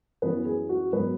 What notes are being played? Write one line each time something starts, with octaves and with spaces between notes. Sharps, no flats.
F#2 E3 B3 C#4 B4
G#4
F#4
G#2 F#3 B3 B4